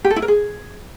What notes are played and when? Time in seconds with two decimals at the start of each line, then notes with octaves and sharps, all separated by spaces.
0.04 G4
0.10 A4
0.16 E4
0.22 A#4
0.28 G#4